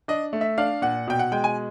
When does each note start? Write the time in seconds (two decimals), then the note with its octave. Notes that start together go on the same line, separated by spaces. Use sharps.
0.08 D4 D#5
0.33 A3
0.41 E5
0.58 D4 F5
0.82 A#2 F#5
1.07 B2 G5
1.19 F#5
1.32 G#3 G5
1.44 G#5